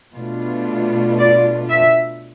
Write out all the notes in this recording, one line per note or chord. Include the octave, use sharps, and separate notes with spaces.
B2 A3 D4 F4
D5
E5